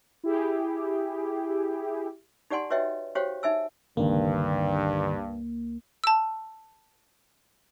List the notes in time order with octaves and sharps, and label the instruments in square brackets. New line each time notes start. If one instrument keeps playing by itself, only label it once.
[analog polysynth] E4 G4 G#4
[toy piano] D#4 G4 D5 F#5 G#5 C6
F#4 B4 C#5 D#5 E5 G5
F#4 G4 C5 C#5 F5 G5
D#4 E5 G#5 E6
[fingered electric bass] G1 D3 D#3 [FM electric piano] C#2 A#3 [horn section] G2
[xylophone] A5 E6